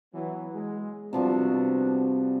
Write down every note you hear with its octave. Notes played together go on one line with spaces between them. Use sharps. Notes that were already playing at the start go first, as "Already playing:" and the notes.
E3 F#3 B3
G#3
C3 F3 G3 B3 D4 F#4